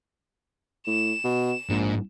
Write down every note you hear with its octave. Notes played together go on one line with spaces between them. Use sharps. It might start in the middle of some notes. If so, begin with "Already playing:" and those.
A2 E7
B2
A#1 G#2